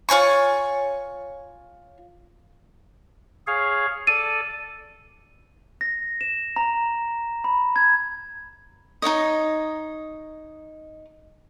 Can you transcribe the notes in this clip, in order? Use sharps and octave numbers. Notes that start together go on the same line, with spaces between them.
F4 C#5 G#5 C#6
G#4 C#5 F5
A4 D5 D#7
A#6
E7
A#5
B5
G#6
D#4 E4 C#5 D#5